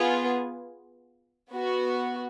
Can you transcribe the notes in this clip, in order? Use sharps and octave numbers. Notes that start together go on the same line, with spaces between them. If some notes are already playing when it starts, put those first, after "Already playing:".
Already playing: B3 F4 G#4
B3 F#4